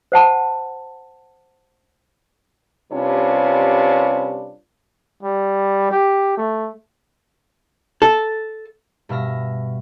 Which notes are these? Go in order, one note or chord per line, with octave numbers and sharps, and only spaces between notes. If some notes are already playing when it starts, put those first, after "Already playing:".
C5 F#5 A5
C3 G3 C#4 D4 F4 B4
G3
G4
A3
A4
G2 B2 E5 F6 A#6